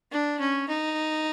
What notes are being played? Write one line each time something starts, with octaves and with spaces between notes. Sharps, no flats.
D4
C#4
D#4